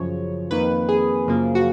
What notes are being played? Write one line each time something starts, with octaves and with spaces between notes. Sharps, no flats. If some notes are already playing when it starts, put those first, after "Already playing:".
Already playing: F#2 C#3 F3 C#5
F2 D#3 A#3 B4
G#4
F#2 C#3 F3 A#3
F#4